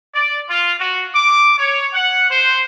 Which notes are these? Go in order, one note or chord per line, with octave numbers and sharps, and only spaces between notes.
D5
F4
F#4
D6
C#5
F#5
C5